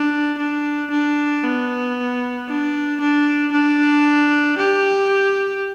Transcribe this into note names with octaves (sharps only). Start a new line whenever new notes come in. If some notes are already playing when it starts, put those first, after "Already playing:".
Already playing: D4
D4
D4
B3
D4
D4
D4
G4